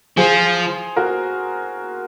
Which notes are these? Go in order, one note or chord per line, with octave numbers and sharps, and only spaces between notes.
F3 G#4 C5
F#4 A#4